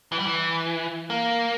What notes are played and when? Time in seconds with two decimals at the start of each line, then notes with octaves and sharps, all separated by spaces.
0.12 E3
0.19 G3
0.26 E3
1.10 A#3